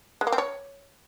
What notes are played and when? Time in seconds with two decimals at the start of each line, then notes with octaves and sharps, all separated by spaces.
0.21 G#3
0.27 A#3
0.32 C4
0.38 C#5